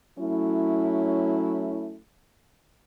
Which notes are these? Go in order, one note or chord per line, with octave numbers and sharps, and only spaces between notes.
F#3 A3 C#4 E4